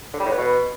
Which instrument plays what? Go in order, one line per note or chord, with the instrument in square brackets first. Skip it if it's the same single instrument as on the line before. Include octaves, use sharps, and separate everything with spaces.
[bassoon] D3
G3
A2
B3
B2